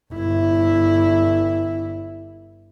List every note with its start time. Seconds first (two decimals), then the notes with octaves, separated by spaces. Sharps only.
0.13 G1 E4